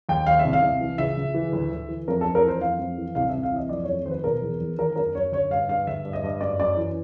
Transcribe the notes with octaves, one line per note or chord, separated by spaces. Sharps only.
D#2 G5
D#2 F5
E5
C2
F5
C2
E3
C#2 E5
C#2
E3
D2
D2
E3
F2 A#4
F2 A4
A#4
E3 C5
F2 F5
F2
E3
C2 F5
C2 E5
F5
E3 D#5
F2 D5
F2 C#5
D#3 C5
B4
B2 A#4
E2
E2
D#3 A#4
F#2 A#4
F#2 C#5
D3 C#5
G2 F5
G2 F5
D3 E5
G2
D#5
G2
F#2 D5
F#2 D5
E3